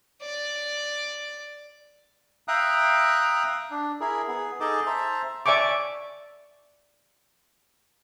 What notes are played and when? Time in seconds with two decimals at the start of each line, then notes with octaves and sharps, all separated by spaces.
0.22 D5
2.48 E5 F5 G5 A#5 D#6 F#6
3.71 D4
4.00 E4 G#4 A#4
4.28 B3 G#4
4.60 D#4 G#4 A4 D#5 A5 D6
4.86 C5 E5 A5 A#5
5.46 D5 E5 G#5 C#6 D6